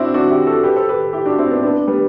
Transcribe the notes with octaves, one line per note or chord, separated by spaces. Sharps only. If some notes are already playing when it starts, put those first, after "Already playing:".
Already playing: C4 D4 E4 F#4
D4 F#4
E4 G4
F#4 A4
G4 B4
A4 C5
G4 B4
E4 G4
D4 F#4
C4 E4
B3 D4
B3 D4
G3 B3